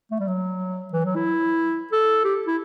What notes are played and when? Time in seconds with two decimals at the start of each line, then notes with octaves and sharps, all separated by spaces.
0.11 A3
0.20 G3
0.28 F#3
0.93 E3
1.05 F#3
1.15 E4
1.92 A4
2.24 G4
2.47 E4